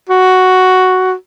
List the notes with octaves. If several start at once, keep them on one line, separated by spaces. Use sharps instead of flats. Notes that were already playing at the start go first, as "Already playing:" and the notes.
F#4